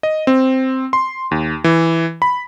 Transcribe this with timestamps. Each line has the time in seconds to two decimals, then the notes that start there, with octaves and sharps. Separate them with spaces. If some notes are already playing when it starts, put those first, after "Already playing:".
0.03 D#5
0.27 C4
0.93 C6
1.31 D#2
1.64 E3
2.22 B5